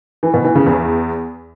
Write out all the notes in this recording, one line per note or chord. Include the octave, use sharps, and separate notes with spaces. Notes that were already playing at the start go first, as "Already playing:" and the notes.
E3
B2
E3
C#3
E2